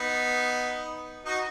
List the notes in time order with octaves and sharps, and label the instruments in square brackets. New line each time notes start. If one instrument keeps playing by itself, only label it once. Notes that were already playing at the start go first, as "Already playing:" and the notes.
Already playing: [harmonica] B3 D#4
D#4 F#4